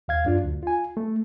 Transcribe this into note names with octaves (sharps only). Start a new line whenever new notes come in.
D#2 F5 G#6
F#2 D4 F4
D2
F4 G#5
A3